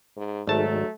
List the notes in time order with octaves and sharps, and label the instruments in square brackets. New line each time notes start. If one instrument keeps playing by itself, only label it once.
[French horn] G#2
[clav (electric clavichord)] G#1 A5 [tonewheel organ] G#2 D#3 G#3 [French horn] F#3 [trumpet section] A3